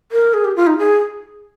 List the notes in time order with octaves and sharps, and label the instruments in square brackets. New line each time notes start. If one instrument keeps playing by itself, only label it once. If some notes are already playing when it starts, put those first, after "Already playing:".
[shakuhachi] A#4
G#4
G4
F4
D#4
G#4